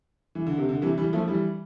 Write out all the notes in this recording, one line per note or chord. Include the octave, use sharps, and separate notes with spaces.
E3
D3
C3
D3
C3 E3
E3 G3
F3 A3
E3 G3